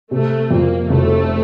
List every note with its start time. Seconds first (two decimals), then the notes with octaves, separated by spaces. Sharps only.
0.11 C3 A3
0.51 F2 A#3
0.90 F1 A3